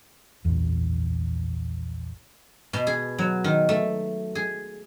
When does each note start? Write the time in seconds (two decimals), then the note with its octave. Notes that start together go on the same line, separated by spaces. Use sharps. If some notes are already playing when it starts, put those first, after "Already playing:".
0.45 A#1 E2
2.73 B2
2.87 G#4
3.19 F#3
3.44 D#3
3.69 A3
4.35 G#4